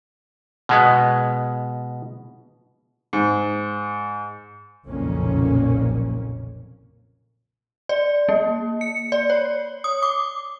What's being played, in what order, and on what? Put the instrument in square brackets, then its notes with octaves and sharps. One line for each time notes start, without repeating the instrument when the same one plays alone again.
[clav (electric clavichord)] B2 G#3 B3
[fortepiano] G#2
[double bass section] F#1 B1 F2 A#2 A#3 C#4
[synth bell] D5
A#3
C#7
D5
C#5
D#6
D6